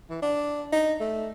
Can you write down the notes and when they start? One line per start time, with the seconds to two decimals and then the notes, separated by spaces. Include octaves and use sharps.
0.10 E3
0.22 D4
0.73 D#4
1.00 A3